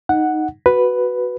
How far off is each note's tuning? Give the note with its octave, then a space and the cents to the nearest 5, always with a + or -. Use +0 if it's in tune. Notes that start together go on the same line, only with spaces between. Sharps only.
D#4 +0 F#5 +0
F#4 +0 B4 +0